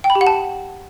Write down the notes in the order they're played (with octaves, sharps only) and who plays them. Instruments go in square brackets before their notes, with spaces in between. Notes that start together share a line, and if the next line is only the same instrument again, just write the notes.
[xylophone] G5
B5
G4
F#5
A5